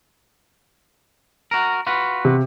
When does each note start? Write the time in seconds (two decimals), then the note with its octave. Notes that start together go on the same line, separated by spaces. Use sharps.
1.51 F#4 A#4
1.87 F4 F#4 B4
2.25 C3